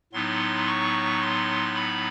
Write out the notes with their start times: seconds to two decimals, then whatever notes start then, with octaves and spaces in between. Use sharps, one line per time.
0.13 A2 F#3 B3 D#4 C6
0.67 C#6
1.21 C6
1.76 B5